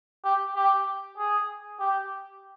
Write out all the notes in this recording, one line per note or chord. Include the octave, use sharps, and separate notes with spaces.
G4
G4
G#4
G4